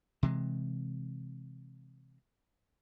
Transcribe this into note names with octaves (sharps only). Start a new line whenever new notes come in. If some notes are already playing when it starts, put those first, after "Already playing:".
C3 E3 G#3